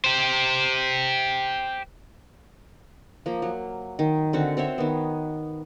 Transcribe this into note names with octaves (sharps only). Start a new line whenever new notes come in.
G4 C5
F3 A#3
F#3
D#3
D3 C4 F#4
C4 C5 C#5 E5
D#3 B3